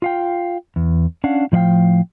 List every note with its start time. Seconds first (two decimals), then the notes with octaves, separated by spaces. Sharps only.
0.02 F4 F5 G5
0.76 E2
1.24 C#4 D4 F5 F#5
1.52 A2 F3 D5 F5 G5